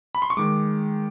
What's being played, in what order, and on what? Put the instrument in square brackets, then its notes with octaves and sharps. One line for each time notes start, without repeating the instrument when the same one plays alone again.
[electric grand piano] B5
C6
C#6
D#3 G#3 D6